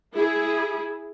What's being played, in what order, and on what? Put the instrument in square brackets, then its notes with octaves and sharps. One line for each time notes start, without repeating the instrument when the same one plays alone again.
[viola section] E4 G#4